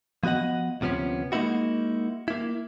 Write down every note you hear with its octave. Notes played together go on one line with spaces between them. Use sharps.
F3 B3 F#4 D#5 F#5
D2 C3 F3 B3 C#4
G#3 A#3 C4 D#4 E4 F#4
A#3 E4